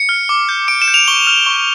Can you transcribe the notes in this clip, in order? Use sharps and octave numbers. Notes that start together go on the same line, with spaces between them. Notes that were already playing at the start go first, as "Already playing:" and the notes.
Already playing: C#7
F6
D6
G6
D6 D7
E7
G6
F7
C#6 G7
F6
C#6